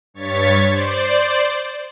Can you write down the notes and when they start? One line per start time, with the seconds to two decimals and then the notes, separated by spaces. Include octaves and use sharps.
0.14 G2 C#5 C#6 A6 B6
0.68 C5 D5